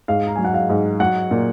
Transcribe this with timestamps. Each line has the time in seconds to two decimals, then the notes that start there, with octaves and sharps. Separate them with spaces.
0.08 G#2 F5
0.27 A#5
0.36 F#3 G#5
0.45 F#5
0.54 F5
0.69 G#2
1.00 F#3 F#5
1.31 A#2